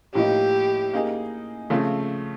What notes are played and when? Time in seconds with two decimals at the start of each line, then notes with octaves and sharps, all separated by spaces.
0.15 A2 F3 A#3 D#4 G4
0.93 A#3 D#4 G#4
1.70 C#3 F3 A3 C4